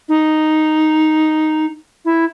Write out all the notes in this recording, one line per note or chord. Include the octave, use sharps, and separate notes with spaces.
D#4
E4